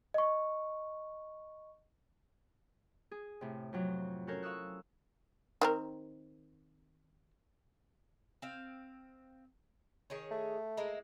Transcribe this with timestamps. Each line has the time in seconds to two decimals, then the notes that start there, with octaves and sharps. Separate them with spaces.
0.14 D#5 C#6
3.11 G#4
3.41 A2 C3
3.73 F2 C3 F#3
4.27 C#4 F#4 A4 A#4 C5 C#5
4.42 F5 C#6 D#6 E6 F#6
5.62 D#3 C4 A#4
8.42 C4 F5
10.10 D#3 G#4 C#5
10.31 A3
10.77 G#3 A#3 E4